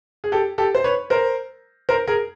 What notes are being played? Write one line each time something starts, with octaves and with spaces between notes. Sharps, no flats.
G#4
G4 A4
G4 A4
C5
B4 C#5
A#4 C5
A#4 C5
G#4 A#4